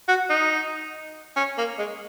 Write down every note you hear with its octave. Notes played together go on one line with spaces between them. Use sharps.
F#4
D#4
C#4
A#3
G#3